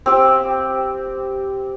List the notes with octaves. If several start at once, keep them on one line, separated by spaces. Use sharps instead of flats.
C4 G4